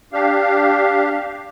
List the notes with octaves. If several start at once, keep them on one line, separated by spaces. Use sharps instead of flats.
D4 G4 F5